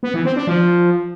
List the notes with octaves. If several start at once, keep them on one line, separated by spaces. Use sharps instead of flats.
B3
E3
C4
D4
F3